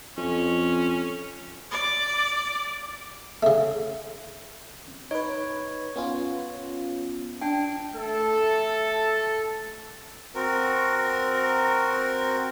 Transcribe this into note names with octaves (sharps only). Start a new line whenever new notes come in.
F2 C#4
D5
C#3 A3
D#4 B4 C#5
B3 C#4 F4
D4 G5
A3 A4
C4 F#4 A#4